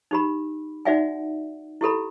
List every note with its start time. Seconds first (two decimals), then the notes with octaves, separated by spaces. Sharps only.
0.11 D#4 G4 B5
0.85 D#4 F#4 D5 E5 F#5 G#5
1.81 E4 G4 A4 B5